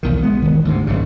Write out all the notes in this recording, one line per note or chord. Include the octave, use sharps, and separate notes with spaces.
B1 E2 D#3
G#3 B3
E1 D#3
D2 G#2 C3
F#1 G#2 C#3